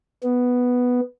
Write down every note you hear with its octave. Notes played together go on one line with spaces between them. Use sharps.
B3